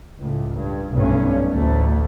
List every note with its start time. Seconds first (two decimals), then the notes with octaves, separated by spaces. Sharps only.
0.19 C#2 A2
0.54 G2
0.93 B1 G2 A3 C#4
1.52 A1 D2 A3